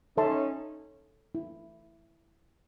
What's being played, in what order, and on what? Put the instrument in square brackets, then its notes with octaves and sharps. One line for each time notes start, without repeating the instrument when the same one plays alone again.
[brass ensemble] C#4 D#4 [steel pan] A4 C#5 E5 A5 C6
[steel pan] E4